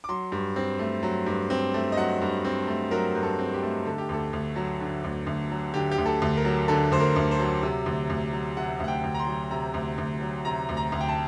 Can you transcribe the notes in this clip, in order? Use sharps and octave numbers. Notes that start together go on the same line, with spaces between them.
D6
F#3 C6
G2
C4
A3
F#3
G2
C4
A3
D#5
F#3 F#5
G2
C4
A3
F#3 A#4
G2
A4
C4
G4
A3
D3 A4
G4
D2 A4
D2
F#3
D3
D2
D2
F#3
D3 G4
G4
D2
A4
D2
A#4
F#3
D3 A4
D2 C5
A#4
D2
C5
F#3
C3
D2
D2
F#3
C3 F#5
D2 F#5
G5
D2
A#5
C6
F#3
C3 A#5
D2
D2
F#3
C3 A#5
D2
A#5
D2
G5
A5